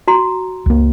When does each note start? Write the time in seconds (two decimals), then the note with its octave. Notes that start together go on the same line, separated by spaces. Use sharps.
0.08 F#4 A#5 C6
0.66 C#2 A#3